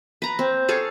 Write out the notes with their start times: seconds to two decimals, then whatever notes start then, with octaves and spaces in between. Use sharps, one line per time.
0.22 B4 A#5
0.39 C4
0.68 G#4 A4 C#5 F5